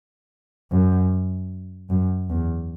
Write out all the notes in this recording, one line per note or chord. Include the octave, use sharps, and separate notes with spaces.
F#2
F#2
E2